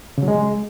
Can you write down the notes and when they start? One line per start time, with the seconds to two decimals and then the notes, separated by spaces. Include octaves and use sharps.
0.18 C#3
0.23 F#3
0.28 G#3